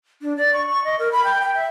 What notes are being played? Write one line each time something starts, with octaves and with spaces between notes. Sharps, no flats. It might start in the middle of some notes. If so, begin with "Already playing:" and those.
D4
D5
C#6
C#6
D#5
A#4
B5
G5
G5
E5